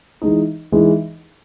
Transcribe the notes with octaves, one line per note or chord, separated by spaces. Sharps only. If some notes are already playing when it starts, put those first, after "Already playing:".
E3 G#3 D#4
E3 G#3 D#4